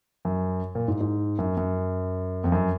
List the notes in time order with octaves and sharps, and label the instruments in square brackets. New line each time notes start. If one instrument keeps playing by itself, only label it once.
[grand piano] F#2
A#2
G#2
G#2
F#2
F#2
F2
F#2